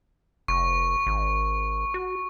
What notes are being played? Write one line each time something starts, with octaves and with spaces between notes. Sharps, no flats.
F1 C#6
G#1
F#4